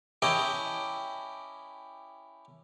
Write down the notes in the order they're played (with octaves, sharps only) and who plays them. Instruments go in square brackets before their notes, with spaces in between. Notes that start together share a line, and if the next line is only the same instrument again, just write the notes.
[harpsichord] C#4 E4 G4 D#5 G5 A5